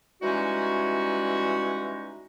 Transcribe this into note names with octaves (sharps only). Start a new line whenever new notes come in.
E3 G3 G#3 C#4 D#4 F#4